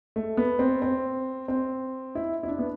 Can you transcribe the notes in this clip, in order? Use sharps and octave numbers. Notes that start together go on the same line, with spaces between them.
A3
B3
C4
C4
C4
E4
E4
D4
B3